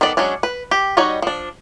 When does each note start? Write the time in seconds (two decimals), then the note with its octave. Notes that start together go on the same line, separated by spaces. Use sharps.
0.01 D#3 B3 A4 D5
0.17 F#3 G#3 C#4 D4
0.43 B4
0.71 G4
0.97 G3 D#4 F#4 C#5 D#5
1.22 F3 D4